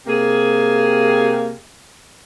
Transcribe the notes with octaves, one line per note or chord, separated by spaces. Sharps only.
C3 A#3 G4 G#4